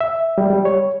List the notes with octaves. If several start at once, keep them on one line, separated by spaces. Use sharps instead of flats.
E5
G3
G3
C#5